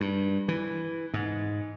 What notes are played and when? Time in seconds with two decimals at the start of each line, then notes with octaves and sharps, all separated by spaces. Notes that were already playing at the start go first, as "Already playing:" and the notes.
0.01 G2
0.48 E3
1.14 G#2